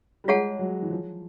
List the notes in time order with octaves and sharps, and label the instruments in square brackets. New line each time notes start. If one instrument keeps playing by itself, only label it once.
[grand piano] G3
[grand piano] G#3 [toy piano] F4 G#4 C#5 F#5 A5
[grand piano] F#3
E3
F3